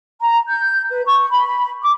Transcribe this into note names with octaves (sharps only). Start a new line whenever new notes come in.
A#5
G6
B4
C#6
B5
D6